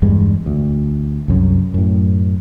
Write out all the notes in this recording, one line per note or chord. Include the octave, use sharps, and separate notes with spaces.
E2 G2 G#3
D2
C2 F#2
F#2 A2